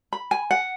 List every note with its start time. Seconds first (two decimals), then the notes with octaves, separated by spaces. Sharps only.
0.13 B5
0.31 G#5
0.51 F#5